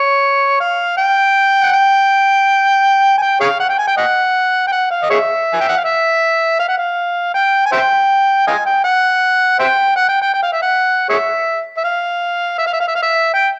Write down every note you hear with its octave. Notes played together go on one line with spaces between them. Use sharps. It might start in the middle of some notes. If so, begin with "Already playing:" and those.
Already playing: C#5
F5
G5
F#5
G5
G#5
G5
G#4 C#5 F5
F#5
G5
G#5
G5
D#5 F#5
G5
F#5
F5
D#5
G#4 C#5 E5
G#5
G5
F#5
F5
E5
F5
F#5
F5
G5
G#5
C5 E5 G5
D#5 F5 G#5
G5
F#5
C5 E5 G5
F#5
G5
G5
G5
F5
E5
F#5
G#4 C#5 E5
E5
F5
E5
F5
E5
F5
E5
F5
E5
G5